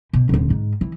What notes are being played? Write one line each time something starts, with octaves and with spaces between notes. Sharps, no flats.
B2
D#1 D3
G#2
E3